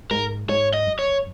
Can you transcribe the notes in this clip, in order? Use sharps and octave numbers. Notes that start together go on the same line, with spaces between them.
G#2 A#4
G#2 C#5
D#5
F#2
C#5